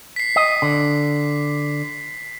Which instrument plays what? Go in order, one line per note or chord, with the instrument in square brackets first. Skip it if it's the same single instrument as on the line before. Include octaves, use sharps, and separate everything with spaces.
[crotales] B6 C7
[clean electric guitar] D#5
D3